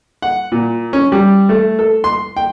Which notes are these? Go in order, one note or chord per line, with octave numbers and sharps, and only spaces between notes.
F#5
A#2
C#4
G3
A3
A4
C6
G5